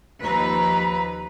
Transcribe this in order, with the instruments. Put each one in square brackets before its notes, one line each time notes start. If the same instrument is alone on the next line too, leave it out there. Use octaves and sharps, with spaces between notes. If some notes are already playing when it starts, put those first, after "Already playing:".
[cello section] D#2 F3 B4 [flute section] A#5